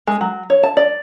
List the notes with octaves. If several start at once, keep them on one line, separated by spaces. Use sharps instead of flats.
G#3
F#3
C#5
A5
D5